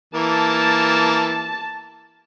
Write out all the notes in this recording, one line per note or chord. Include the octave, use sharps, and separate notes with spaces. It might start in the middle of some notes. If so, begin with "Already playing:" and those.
E3 A#3 A5